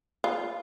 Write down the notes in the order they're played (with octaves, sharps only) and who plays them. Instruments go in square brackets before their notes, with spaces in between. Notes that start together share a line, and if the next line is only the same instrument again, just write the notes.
[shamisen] F4